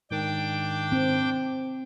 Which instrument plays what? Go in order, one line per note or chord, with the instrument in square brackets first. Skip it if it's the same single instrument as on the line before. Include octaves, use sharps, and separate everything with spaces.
[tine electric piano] G#2 D#3 [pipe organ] D4 G5 D6
[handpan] C4